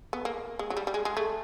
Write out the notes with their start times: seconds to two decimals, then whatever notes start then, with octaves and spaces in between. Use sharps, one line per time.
0.13 B3
0.25 A#3
0.59 G#3
0.70 F#3
0.77 G3
0.87 G3
0.94 G#3
1.05 G#3
1.17 A3